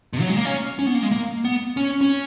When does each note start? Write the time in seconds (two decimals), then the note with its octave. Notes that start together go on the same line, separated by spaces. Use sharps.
0.13 B2
0.21 F#3
0.29 G#3
0.37 A#3
0.45 C#4
0.79 C#4
0.87 B3
0.95 A#3
1.03 G#3
1.11 A#3
1.45 B3
1.77 C#4
2.01 C#4